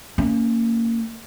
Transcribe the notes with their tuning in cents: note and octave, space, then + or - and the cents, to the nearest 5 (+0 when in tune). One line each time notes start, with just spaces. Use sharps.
A#3 -25 C#4 +5